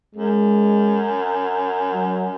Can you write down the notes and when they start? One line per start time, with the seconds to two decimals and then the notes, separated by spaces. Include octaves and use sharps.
0.15 F#2 G#3
1.94 F#3